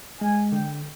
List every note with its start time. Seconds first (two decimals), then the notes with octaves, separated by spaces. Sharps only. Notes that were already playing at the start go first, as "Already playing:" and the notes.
0.21 G#3 G#5
0.52 D3 G5